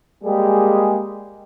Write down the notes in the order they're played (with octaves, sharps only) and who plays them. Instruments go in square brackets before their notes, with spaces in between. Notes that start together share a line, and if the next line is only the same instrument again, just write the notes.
[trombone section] G3 G#3 A#3 G4 G#4